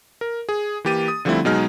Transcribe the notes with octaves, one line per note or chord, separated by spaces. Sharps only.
A#4
G#4
E3 A#3 G4 A6 D#7
D#6
D3 F3 G3 A3 C4 E4
B2 F#3 G#3 D#4 G#4 F6